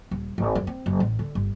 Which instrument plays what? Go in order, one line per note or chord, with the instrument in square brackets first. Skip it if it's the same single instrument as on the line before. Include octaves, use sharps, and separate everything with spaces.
[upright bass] D#1
G#1
F#2
C4
F#1
A1
D3
G1